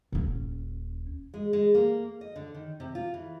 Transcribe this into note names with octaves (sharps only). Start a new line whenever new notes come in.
D#1 C#4
G#3
G#3
A#3
D#5
D3
D#3
C3
F4
E3